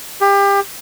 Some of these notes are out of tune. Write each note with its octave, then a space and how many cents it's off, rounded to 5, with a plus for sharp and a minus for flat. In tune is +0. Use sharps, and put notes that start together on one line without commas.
G4 +30